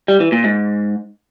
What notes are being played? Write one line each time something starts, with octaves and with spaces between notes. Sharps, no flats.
G3
E3
A#2
G#2